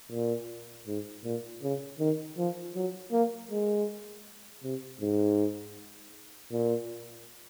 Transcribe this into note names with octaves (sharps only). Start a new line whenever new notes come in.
A#2
G#2
A#2
C#3
D#3
F3
F#3
A#3
G#3
C3
G#2
A#2